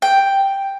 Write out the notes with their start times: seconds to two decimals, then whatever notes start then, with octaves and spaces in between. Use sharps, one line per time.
0.02 G5